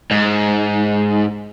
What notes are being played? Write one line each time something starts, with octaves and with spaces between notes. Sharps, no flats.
G#2